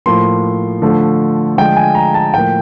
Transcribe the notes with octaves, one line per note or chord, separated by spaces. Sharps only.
A2 F3 A#3 C6
D3 F3 A3
D3 F3 G#3 G5
G#5
A#5
A5
A2 F3 A#3 G5